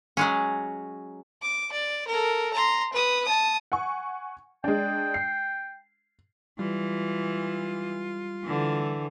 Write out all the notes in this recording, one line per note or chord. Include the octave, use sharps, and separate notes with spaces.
F#3 G#3 C#4
D6
D5
A4 A#4
A#5 C6
B4 D#6
A5 D#6
F#5 G#5 C#6
G#3 D4 G5
C7
E3 G3 F4
D3 E3